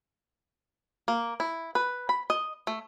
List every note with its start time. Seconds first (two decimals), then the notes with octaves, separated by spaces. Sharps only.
1.08 A#3
1.40 E4
1.75 B4
2.09 B5
2.30 D#5
2.67 A3